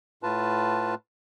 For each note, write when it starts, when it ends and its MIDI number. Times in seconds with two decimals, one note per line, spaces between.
0.23 0.95 45
0.23 0.95 65
0.23 0.95 71
0.23 0.95 81